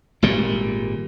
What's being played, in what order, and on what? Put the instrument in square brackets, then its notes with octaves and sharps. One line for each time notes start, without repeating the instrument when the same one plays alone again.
[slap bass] G#1 A#2 G3